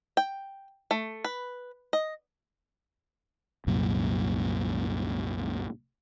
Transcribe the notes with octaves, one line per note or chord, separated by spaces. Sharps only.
G5
A3
B4
D#5
C2 F#2 A#2